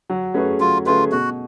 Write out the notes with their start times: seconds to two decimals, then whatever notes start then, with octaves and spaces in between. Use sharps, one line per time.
0.10 F#3
0.34 A3 C#4 G#4 B4
0.60 F#3 F4
0.86 A3 C#4 F4 G#4 B4
1.12 B2 F#4